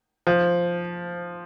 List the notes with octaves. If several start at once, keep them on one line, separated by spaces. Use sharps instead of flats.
F3